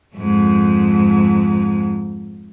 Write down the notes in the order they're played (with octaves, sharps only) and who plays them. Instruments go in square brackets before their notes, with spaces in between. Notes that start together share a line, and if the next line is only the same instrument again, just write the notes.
[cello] F2 G#2